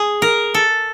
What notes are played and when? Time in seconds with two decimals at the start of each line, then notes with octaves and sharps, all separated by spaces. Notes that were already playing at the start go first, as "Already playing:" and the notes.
Already playing: G#4
0.22 A#4
0.54 A4